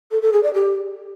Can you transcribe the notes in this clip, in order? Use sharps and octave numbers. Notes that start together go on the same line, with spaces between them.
A4
A4
G#4
D5
G4